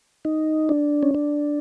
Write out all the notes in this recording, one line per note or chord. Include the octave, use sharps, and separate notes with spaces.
D#4
D4
C#4
D4